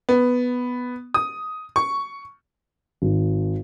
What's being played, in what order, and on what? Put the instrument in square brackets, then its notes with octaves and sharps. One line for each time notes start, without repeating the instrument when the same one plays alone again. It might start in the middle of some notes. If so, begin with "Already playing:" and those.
[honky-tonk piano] B3
D#6
C#6
[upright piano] G#1